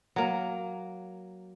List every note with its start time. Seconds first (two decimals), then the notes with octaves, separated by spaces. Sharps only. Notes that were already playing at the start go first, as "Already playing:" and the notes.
0.16 F#3 A#3